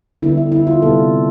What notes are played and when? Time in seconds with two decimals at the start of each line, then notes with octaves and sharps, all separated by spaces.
0.22 D3 G3 B3 E4
0.37 E4
0.52 E4
0.67 F4
0.82 C3 G3 B3 A4